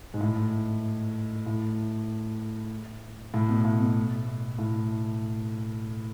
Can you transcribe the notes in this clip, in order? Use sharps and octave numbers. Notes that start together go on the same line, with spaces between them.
G#2
A2
A2
A2
B2
A2
B2
A2